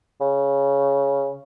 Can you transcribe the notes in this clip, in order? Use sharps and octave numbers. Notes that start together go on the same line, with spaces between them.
C#3